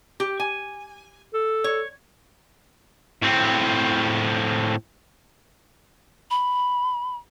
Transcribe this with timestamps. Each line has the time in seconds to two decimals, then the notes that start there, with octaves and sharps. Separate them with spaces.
0.20 G4
0.40 G#5
1.34 A4
1.64 C#5
3.22 A2 C4
6.30 B5